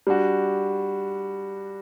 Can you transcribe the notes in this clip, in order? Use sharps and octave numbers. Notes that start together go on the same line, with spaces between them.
G3 D4 F#4